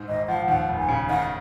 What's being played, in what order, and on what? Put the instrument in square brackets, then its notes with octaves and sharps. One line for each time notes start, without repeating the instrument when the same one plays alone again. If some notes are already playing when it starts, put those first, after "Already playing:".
Already playing: [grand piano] G#2
[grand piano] G#1 [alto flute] D#5
[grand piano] F3 [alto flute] F#5
[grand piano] D#2 [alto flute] F#5
[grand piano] F1
[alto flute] G#5
[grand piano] C#3
[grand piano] D#3 [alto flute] F#5